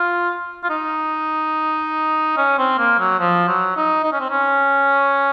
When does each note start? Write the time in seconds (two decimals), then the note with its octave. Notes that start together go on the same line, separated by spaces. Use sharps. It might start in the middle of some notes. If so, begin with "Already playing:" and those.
Already playing: F4
0.64 F4
0.70 D#4
2.37 C#4
2.58 C4
2.78 A#3
2.99 F#3
3.20 F3
3.48 F#3
3.76 D#4
4.04 D#4
4.13 C#4
4.20 C4
4.30 C#4